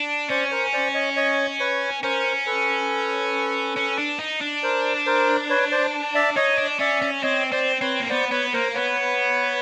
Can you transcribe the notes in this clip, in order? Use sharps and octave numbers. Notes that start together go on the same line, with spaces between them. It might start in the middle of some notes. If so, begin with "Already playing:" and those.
Already playing: D4
C#4 C5 D5
C#5
A#4 C5
C5 D5
C#5 D#5
C#5 D#5
B4 C#5
C#4 A#4 C5
A4 B4
C#4
D4
D#4
D4
A#4 C5
A#4 C5
B4 C#5
C5 D5
D5 E5
D#4 C#5 D#5
D4
C#4 D5 E5
C#4
C4 C#5 D#5
C4 C5 D5
C4 B4 C#5
A#3
B3 C5 D5
B3 B4 C#5
A#3 A#4 C5
B3 B4 C#5